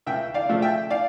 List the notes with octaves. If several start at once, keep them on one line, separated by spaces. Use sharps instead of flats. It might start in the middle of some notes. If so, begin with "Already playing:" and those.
C#2 E5 G5
D5 F5
C#3 F3 A3
E5 G5
D5 F5